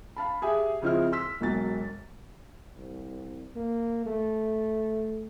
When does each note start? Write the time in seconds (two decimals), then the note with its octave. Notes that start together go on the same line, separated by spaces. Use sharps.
0.16 F5 A5 B5
0.42 G4 G#4 E5
0.82 C#3 F3 C4 E4 D#5 F6
1.12 C6 E6 B6
1.41 E1 B1 F#3 A6
2.76 C2
3.56 A#3
4.06 A3